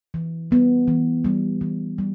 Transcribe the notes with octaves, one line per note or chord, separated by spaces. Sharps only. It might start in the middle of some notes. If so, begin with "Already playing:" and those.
E3
G3 B3
E3
G3 B3
E3
G3